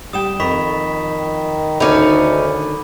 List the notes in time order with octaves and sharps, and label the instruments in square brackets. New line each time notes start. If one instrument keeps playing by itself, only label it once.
[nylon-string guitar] G3 G5 [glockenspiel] D#6 E7
[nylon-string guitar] F2 [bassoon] D#3 [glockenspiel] B5 C#6 B6
[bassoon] D2 [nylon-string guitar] D3 D#3 [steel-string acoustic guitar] C#4 D#4 [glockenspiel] B5 D6 D#7